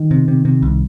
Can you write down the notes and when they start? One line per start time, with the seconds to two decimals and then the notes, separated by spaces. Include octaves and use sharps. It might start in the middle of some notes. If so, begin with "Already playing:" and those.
Already playing: D#3
0.11 C3
0.28 C3
0.45 C3
0.62 C2